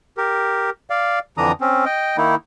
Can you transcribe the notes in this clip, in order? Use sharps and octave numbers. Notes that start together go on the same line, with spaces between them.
G4 A#4
D5 F5
F2 D3 E3 D4 A#5 D#6
C4 C#4
D#5 G5
D#3 A#3 D#4 E4